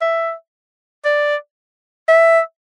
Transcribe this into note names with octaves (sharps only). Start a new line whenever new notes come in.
E5
D5
E5